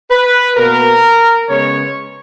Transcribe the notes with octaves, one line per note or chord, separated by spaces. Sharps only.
B4
B2 A#3 A#4
C#3 G#3 B3 C#5